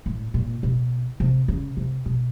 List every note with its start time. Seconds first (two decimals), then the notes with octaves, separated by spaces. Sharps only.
0.06 A2
0.34 A#2
0.63 B2
1.20 C3
1.48 C#3
1.77 C3
2.06 B2